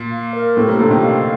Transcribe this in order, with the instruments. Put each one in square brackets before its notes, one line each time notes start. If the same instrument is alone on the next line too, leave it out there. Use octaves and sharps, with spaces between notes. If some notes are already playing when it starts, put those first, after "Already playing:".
Already playing: [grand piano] A#2
[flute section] F5
A#4
[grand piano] A2 C3 [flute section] A4
[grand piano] G3 A#3
C3
[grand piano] A#2 D3 [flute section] A4
[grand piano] C3 D#3
[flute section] F5